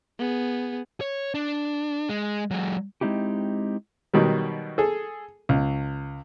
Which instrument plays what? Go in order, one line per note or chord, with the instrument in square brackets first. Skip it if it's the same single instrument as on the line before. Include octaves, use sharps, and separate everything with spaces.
[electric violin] B3 G#4
[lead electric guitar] C#5
D4
G#3
F#3 G#3
[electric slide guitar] G#3 C4 D#4 E4 G4
[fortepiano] B2 D#3 F#3 G3
G#4 A4
C#2